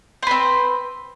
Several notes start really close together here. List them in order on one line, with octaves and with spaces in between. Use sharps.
C5 B4 C4